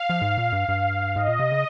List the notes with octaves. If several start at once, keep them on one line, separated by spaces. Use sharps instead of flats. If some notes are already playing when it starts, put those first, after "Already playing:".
Already playing: F5
F3
G#2
A#2
G2
G2
G#2 D#5
A#2
C3
C#3